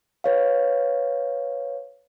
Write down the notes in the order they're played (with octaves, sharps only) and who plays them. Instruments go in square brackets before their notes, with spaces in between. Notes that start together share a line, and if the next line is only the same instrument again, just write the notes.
[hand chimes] B4 C#5 F5